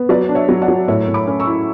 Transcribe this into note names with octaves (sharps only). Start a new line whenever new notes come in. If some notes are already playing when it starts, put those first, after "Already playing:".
Already playing: B3
F#3 B4 D5
D4
C#5 E5
F#3
D5 F#5
F#3
A2 C#5 E5
A2
B5 D6
C#4
C#6 E6
E4